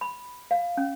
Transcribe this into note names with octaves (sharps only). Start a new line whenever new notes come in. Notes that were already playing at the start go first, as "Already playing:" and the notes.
B5
F5
C#4